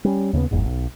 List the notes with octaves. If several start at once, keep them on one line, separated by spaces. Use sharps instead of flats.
G3 C#4
D#2 C#3 A#3 B3
F#1 E2 G#2
B1